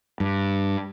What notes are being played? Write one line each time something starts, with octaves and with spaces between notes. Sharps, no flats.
G2